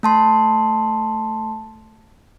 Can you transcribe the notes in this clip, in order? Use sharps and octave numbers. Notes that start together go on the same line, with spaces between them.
A3 A5 C6